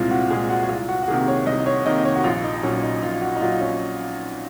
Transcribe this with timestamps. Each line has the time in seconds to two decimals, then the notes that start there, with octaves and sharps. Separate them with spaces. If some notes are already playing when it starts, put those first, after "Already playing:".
Already playing: C2 A#2 G#3 C4 F4
0.11 F#4
0.30 A#2 G#3 C4 G#4
0.49 F#4
0.63 F#4
0.69 C2 F4
0.88 F#4
1.03 F#4
1.08 C3 D#3 A#3 G#4
1.28 C#5
1.46 C2 D#5
1.66 C#5
1.85 C3 D#3 A#3 D#5
2.05 C#5
2.15 F#4
2.24 A#1 F4
2.44 D#4
2.56 D#4
2.63 A#2 F#3 C#4
2.83 D#4
3.02 A#1 F4
3.21 F#4
3.36 D#4
3.40 A#2 F#3 F4
3.61 C#4